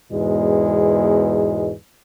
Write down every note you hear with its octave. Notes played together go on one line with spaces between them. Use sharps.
E2 G#2 B2 G#3